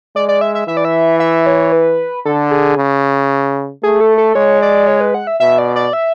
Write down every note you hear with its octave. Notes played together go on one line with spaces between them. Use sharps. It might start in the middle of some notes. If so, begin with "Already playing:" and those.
G#3 D5
D5
E5
E5
E3 E5
D5
E5
E5
C#5
B4
D3 A4
G#4
C#3
A3 G#4
A4
A4
G#3 C#5
D5
C#5
B4
F#5
E5
B2 E5
D5
D5
E5